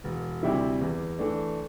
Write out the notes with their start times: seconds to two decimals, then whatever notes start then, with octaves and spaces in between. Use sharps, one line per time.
0.04 E1
0.43 D2 C3 G3 E4
0.81 E2
1.19 E3 A3 D4